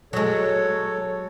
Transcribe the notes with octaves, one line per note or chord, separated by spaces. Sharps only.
F#3 G#3 A4 C#5